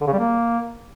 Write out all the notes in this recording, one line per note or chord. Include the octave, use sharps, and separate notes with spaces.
D3
C#3
G3
A#3